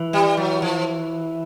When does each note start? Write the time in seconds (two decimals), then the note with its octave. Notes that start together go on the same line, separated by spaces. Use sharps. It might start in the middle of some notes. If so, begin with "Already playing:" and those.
Already playing: E3
0.13 G3
0.37 F#3
0.62 F3